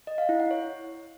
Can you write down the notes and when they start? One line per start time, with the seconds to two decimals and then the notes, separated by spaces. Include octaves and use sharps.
0.07 D#5
0.18 F5
0.29 E4
0.40 F#5
0.51 C#5